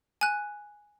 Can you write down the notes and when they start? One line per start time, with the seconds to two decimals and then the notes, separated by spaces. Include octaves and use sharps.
0.21 G#5 F#6